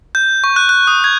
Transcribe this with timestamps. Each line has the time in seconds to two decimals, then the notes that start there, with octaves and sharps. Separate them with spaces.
0.15 G6
0.44 C#6
0.56 F#6
0.69 F#6
0.87 D#6
1.04 G#6